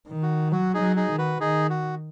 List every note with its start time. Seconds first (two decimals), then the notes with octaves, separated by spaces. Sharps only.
0.09 D#3
0.23 F#4
0.52 F#3 F#4
0.74 D#4 G#4
0.81 F#3
0.96 D#4 G#4
1.12 D#3
1.18 F#4 B4
1.40 D#3 D#4 G#4
1.70 F#4